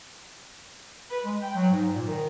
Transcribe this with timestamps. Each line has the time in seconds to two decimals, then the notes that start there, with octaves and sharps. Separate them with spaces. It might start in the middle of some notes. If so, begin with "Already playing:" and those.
1.10 B4
1.24 G#3
1.42 G5
1.56 F#3
1.71 G#2
1.93 A#2
2.07 D#3